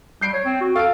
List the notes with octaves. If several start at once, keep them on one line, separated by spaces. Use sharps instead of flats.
G3 G6 C7 D7
C#5
C4
F#4
A4 F5 D7